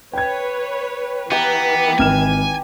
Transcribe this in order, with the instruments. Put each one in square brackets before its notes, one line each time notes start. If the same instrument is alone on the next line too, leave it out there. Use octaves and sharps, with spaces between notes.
[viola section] B4 C#5 [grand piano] G5 G#6
[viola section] E3 [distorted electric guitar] B3 [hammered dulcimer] G4 A#5
[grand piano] G#1 F6 E7 [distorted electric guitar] G#5